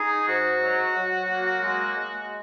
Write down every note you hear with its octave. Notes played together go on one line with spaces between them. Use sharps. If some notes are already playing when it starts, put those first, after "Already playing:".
Already playing: D#4 G#4
G#2 F#4
F#3
F#3
A#3
G#3
G#3